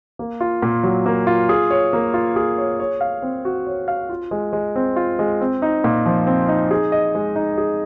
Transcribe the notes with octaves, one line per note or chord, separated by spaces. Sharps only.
A#3
F4
A#2
F#3
A#3
F4
G#4
C#5
A#3
F4
G#4
C#5
C#5
F5
C4
F#4
C#5
F5
F4
G#3
G#3
C4
F4
G#3
C4
D#4
A#2
F3
C4
D#4
G#4
D#5
G#3
D#4
G#4